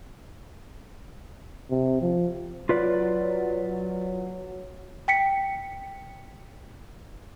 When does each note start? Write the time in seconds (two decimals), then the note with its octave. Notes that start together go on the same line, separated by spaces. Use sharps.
1.70 C3
2.01 F3
2.69 F#3 F4 B4 D5
5.08 G5 B6 C#7